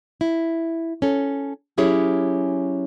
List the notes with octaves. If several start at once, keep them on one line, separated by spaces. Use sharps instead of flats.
E4
C#4 A4
F#3 C#4 E4 G4 G#4 C#5